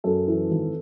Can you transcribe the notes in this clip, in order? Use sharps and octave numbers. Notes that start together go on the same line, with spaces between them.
F#2 A4
E3
G#1